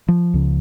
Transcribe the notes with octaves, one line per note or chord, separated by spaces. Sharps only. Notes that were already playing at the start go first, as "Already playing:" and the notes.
F3
C#2 C#3